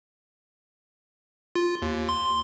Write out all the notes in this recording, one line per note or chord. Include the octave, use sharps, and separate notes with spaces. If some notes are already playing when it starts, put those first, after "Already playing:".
F4
D#2
C6